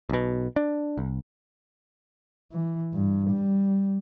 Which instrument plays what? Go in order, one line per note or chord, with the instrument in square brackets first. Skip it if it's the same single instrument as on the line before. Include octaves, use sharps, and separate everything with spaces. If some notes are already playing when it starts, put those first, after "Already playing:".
[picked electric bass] B1 B2
D4
C2
[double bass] E3
G2
G3